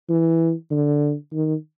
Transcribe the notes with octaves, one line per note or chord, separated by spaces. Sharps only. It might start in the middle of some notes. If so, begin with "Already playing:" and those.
E3
D3
D#3